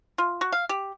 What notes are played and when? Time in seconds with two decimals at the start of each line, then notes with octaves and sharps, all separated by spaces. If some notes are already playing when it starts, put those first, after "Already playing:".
0.18 F4
0.41 F#4
0.52 F5
0.69 G4